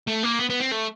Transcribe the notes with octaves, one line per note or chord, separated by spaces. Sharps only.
A3
A#3
B3
B3
C4
A3